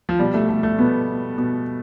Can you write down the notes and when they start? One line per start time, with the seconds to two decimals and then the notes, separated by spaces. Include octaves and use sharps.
0.09 F3
0.19 B2 G3
0.34 A3
0.49 A3
0.63 A3
0.79 B2 B3
1.38 B2